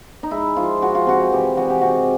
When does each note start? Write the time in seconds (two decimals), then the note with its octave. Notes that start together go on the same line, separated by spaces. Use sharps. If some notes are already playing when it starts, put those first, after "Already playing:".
0.23 D#4
0.31 G#3 E4
0.56 F3 F4
0.82 G#3 F#4
0.95 F4
1.07 C3 F#4
1.32 E3 G4
1.57 G#3 F#4
1.70 G4
1.81 C3 F#4